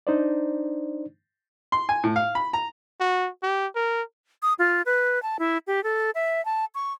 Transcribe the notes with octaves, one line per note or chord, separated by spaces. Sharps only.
D4 D#4 C5 D5
C6
G#5
A2
F5
B5
A#5
F#4
G4
A#4
D#6
F4
B4
A5
E4
G4
A4
E5
A5
C#6